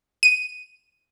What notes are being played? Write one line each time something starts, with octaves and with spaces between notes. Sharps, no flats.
D#7